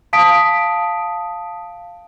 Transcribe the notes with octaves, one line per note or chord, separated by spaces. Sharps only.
F5 A5 D#6 B6 D7